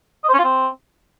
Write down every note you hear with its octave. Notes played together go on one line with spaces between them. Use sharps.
D#5
C5
C#4
F4
C4